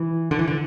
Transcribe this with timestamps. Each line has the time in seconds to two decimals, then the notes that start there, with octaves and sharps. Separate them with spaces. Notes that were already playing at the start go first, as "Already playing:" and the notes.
Already playing: E3
0.31 D3
0.39 E3
0.47 D3